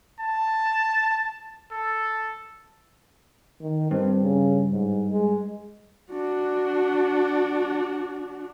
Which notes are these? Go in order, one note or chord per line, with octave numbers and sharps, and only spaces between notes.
A5
A4
D#3
G2 C4
C#3
G#2
G#3
D4 F#4